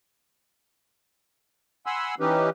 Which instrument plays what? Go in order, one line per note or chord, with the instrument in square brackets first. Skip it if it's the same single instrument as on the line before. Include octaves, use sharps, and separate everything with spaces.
[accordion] F#5 G#5 B5 C6 E6
E3 C#4 D#4 G4 B4